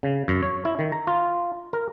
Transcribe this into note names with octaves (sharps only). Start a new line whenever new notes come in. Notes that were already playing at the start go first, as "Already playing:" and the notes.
C#3
F#2
C#5
E4
D#3
A#5
F4
A#4